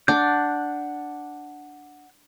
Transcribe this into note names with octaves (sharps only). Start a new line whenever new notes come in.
D4 F#5 G6